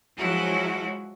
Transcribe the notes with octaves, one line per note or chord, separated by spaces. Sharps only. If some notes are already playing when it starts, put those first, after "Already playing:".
F3 F#3 G#3 E4 F#4